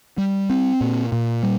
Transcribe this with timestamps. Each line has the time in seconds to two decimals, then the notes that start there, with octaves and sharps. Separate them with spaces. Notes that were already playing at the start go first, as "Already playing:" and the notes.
0.18 G3
0.50 C4
0.81 A#2
1.12 A#2
1.43 G3